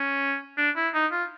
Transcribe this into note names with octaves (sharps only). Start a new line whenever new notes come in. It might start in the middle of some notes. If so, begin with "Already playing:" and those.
Already playing: C#4
D4
E4
D#4
F4